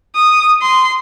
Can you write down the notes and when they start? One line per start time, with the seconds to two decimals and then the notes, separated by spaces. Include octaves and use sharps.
0.16 D#6
0.62 C6